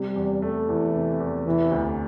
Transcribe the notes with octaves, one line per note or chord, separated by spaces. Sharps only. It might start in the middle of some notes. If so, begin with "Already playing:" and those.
Already playing: C3 G3
E2
A3
E2 E3
C3
E2
C3 E3
D2